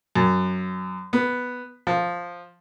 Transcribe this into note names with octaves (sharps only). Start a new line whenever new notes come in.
F#2
B3
F3